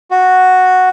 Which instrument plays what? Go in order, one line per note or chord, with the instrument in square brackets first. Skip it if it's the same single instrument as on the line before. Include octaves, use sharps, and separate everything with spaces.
[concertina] F#4